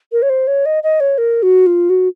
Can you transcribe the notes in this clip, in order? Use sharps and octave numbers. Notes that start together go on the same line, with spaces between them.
A#4
C#5
C5
C#5
D#5
D#5
C#5
A#4
F#4
F4
F#4